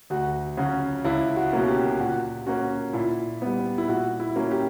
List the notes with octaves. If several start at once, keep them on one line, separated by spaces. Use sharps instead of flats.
D2 F#4
C#3 F#3 C#4 F#4
C#2 E4
F#4
B2 F#3 A#3 C#4
G4
A#2 F#4
A#3 C#4 F#4
A#2 E4
G3 B3
E4
A#2 F#4
E4
F#3 A#3 C#4
G4